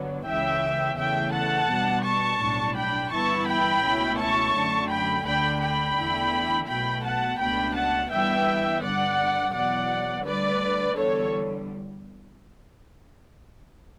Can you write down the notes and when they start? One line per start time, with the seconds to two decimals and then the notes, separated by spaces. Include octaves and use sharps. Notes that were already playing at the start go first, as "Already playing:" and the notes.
Already playing: G1 G2 D3 F#3 B3
0.26 C#2 C#3 E3 E5 G5
0.97 E2 C#3 E3 A3 E5 G5
1.33 F#5 A5
1.69 B2 G3 D4
2.04 A5 C#6
2.40 B1 A2 G3 D4
2.75 G5 B5
3.11 G1 G2 E3 B3 E4 A5 C#6
3.47 G5 B5
3.83 C#2 B2 A3 C#4 E4
4.18 A5 C#6
4.54 F#2 D3 A3
4.89 G5 B5
5.25 D2 D3 A3 D4 G5 B5
5.61 G5 B5
5.97 E2 D3 A3 E4
6.68 B1 B2 A3 G5 B5
7.04 F#5 A5
7.40 C#2 B2 A3 D4 G5 B5
7.75 F#5 A5
8.11 G1 G2 E3 G3 B3 E5 G5
8.82 G2 D3 G3 D5 F#5
9.53 E2 B2 F#3 D5 F#5
10.25 D2 D3 G3 B4 D5
10.96 E2 D3 G3 A4 C#5